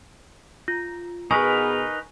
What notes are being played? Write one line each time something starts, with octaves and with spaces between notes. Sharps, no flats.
F4
B2 B3 D#4 G#4 A#4 B4 G#5 C#6